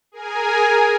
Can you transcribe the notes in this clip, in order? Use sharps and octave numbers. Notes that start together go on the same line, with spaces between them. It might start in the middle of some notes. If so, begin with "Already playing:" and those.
G#4 A#4 G#5